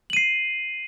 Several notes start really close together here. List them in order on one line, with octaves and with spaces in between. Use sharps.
F#7 D#7 C7